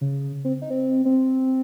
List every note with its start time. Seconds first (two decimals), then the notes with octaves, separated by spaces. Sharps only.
0.01 C#3
0.45 C4
0.62 D#4
0.70 C4
1.05 C4